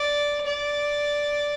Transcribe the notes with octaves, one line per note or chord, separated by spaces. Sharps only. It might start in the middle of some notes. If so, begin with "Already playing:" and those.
Already playing: D5
D5